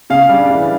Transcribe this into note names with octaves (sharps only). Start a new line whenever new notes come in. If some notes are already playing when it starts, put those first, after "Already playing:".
C#3 F5
G3 D4
E3